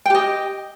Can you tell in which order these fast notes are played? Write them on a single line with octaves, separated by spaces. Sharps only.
G5 G4 D#5